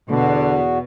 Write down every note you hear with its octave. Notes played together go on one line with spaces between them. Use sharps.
E2 B2 D3 F#4